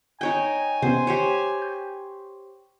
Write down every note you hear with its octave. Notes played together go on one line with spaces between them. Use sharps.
D#4 C#5 G5 G#5
C3 B3 C#4 C5
G4 C5 C#5
G6